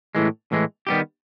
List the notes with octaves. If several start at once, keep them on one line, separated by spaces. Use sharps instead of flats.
A2 E3 G#3
A2 E3 G#3
D#3 G3 B3 E4 G4